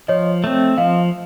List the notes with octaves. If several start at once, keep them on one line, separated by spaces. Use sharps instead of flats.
F3 C#5 D#5
A3 C4
F3 D#5 F5